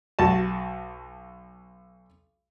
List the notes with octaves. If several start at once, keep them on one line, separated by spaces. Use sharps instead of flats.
B1 F#4 A5